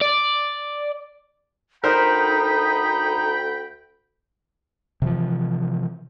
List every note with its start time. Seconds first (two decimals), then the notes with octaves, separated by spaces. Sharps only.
0.01 D5
1.84 D2 D#4 A#4 C5 G5 B5
5.02 C3 E3 F3